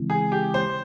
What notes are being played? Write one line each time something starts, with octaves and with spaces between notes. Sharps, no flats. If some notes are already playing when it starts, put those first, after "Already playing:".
Already playing: C#3 E3 G#3 C4 E4
G#4
G4
C5